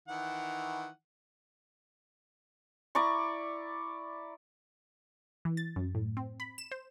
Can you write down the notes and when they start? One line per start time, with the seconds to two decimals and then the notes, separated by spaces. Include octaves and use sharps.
0.08 D#3 E3 F#5
2.95 E4 D5 A#5 C#6
5.45 E3
5.57 A6
5.76 F#2
5.95 A2
6.17 C4
6.40 B5
6.58 E7
6.71 C5